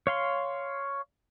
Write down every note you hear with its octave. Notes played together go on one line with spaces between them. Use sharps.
C#5 F5 C6